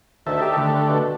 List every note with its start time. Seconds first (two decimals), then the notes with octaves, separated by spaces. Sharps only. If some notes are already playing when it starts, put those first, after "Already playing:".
0.27 D2 D#3 A4 E5
0.42 G4
0.58 D3 A3
0.89 B2